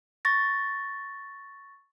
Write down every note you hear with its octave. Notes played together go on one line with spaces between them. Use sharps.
C#6 A6 A#6